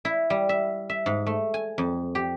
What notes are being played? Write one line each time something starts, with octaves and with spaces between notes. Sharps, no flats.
E4
G3
E5
E5
G#2
A3
G#5
F2
G4